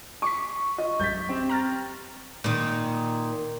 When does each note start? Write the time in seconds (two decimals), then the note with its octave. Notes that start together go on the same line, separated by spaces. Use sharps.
0.22 C#6 D6 B6
0.78 F4 D#5
1.00 A#1 F#2 G3 G6 A6 B6
1.29 C4 G4
1.49 A#5 F6 A6
2.44 A#2 D#3